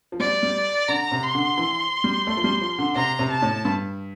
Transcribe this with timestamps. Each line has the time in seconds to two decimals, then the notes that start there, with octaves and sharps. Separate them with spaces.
0.12 F3
0.20 G3 D5
0.43 G3
0.88 D3 A#5
1.12 C3
1.23 C6
1.35 D3
1.58 E3
2.04 G3
2.27 A3
2.37 F3
2.44 G3
2.61 F3
2.79 D3
2.96 C3 A#5
3.19 C3
3.31 A5
3.42 A2
3.65 G2